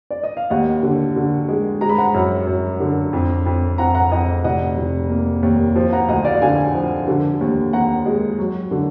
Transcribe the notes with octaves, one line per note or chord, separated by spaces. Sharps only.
D5
D#5
F5
D#2 D#5 F#5
D3
D3
G#3
G#3 A#5
B5
F#5 A#5
F#2
F#2
D3
F2
F2
F2 F#5 A#5
F#5 A#5
F2 D#5 F#5
F1 D#5 F#5
F1
A#3
D#2
F3
F#5 A#5
D2 D#5 F#5
D5 F5
D3 F5 G#5
F3
D3
D#2
D#2 F#5 A#5
G#3
F#3
D3